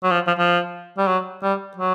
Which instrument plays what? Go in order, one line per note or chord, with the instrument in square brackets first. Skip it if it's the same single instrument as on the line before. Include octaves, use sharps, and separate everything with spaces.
[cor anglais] F#3
F3
F3
F3
G3
F#3
G3
F#3